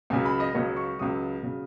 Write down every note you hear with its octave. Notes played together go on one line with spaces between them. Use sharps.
C#2 C#3 F#3 G#5
B5
D#5
C#2 C#3 F#3 C#5
C#6
C#2 C#3 F#3 D#6
C#3 F#3